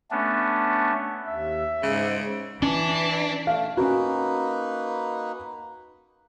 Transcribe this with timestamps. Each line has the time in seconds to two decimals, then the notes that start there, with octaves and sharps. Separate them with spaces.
0.11 A3 B3 C#4 D4
1.28 D#2 E5
1.83 G#2 C#3 G#3
2.62 E3 C#4 D4
3.47 A3 F5
3.77 A#3 C#4 D#4 F#4 B4